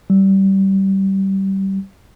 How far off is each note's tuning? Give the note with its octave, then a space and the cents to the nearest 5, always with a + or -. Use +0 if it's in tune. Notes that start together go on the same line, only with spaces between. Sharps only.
G3 -20